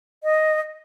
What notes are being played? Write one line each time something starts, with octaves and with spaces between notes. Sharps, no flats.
D#5